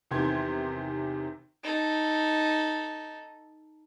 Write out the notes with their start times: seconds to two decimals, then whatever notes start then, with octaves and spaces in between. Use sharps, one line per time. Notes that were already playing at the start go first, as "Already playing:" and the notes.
0.11 E2 C3 D#3 G4 C6 G#6
1.63 D#4 A4